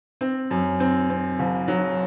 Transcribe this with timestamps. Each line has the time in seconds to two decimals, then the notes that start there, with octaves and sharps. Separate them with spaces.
0.21 C4
0.51 F#2
0.80 C4
1.10 C4
1.39 F#1
1.68 F#3